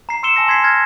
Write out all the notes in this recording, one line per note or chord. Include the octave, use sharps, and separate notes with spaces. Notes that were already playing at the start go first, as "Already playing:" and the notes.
A#5 C7
C6 E6 C#7 E7 G7
G#5 A5 E6 A#6 C#7 E7
G#5 C6 G#6 B6 C7
F6 G#6 A#6